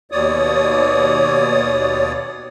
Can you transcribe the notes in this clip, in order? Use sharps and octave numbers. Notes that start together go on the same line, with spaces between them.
D#2 B2 C#5 D5 D#6